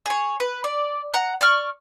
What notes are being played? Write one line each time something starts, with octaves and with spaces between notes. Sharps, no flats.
G#4 C#5
B4
D5
F#5 A#5 F#6
D5 C#6 F6